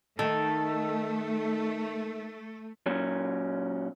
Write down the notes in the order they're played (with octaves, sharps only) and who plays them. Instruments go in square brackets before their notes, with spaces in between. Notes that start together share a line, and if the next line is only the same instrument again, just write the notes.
[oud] D#3 [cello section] A3 [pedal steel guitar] A4
[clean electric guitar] A#2 F#3 C#4